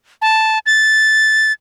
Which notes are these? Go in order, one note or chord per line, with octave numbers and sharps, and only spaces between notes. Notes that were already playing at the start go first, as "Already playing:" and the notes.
A5
A6